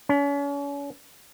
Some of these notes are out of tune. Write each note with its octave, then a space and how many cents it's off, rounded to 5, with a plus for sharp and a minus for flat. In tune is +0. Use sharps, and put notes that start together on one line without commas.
C#4 +40